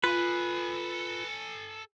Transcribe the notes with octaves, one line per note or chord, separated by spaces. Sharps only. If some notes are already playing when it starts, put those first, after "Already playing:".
F4 A4 B4 G#5